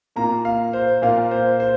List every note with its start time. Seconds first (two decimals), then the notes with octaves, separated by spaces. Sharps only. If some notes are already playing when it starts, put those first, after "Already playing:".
0.16 A#2 A#3 F4 A#5
0.45 F5
0.73 C5
1.02 A#2 A#3 F4 F5
1.31 C5
1.60 C5